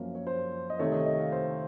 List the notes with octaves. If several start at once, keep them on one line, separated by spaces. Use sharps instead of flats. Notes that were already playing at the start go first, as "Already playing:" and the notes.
Already playing: F#2 F3 A#3 C#4
C#5
C5
D#5
C3 D#3 A3 C#5
D#5
D#5
F5
C5